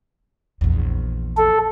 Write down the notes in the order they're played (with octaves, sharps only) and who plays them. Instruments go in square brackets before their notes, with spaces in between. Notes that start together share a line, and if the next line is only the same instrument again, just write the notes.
[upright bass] A#1 E2
[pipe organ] A4